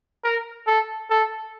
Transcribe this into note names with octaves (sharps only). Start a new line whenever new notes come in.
A#4
A4
A4